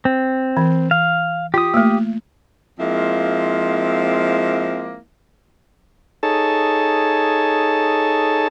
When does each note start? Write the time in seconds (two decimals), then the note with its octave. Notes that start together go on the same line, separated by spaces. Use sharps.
0.05 C4
0.57 E3
0.91 F5
1.54 F4 G4 D#6
1.74 A3 A#3
2.79 F3 G#3 A#3 C4 E4
6.23 D#4 G#4 A4 C#5 A5